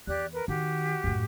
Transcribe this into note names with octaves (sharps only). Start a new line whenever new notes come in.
E2 G4 D5 F#6
A#4 B4
D#3 F#4 G4
F#2 A2